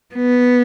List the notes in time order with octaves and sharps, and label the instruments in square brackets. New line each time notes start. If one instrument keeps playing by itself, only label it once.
[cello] B3